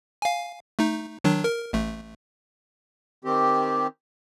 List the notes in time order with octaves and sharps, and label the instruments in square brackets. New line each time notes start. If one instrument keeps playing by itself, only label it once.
[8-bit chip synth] F5 G#5
A3 D#4
D#3 F#3 D4
A#4
A1 A3
[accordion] D#3 C4 G4